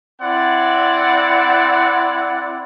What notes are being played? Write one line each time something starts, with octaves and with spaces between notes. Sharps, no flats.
C4 E4 D5 F#5